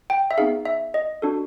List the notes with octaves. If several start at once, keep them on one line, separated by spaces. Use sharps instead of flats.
G5
E5
B3 D#4 G#4 F5
E5
D#5
D4 F#4 A4